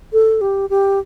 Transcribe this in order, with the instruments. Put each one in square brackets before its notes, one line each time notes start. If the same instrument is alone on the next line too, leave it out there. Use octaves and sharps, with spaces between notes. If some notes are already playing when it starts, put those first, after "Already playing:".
[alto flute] A4
G4
G4